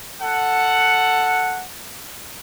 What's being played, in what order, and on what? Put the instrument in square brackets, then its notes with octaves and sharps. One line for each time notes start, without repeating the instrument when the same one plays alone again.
[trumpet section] A4 F#5